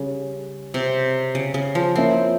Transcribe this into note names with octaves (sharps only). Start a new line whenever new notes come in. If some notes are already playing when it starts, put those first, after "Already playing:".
Already playing: C#3 G3 C#4 G#4
C3
C#3
C#3
F3
A#3 C4 C#4 E4